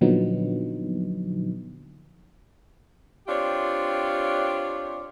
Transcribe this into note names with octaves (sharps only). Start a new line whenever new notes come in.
A#2 D3 F3 F#3 B3 D#4
C4 D4 F4 G4 C#5